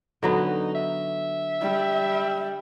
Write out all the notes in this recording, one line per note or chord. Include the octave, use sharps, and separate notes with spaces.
D3 F#3 B3 D#4
E5
G3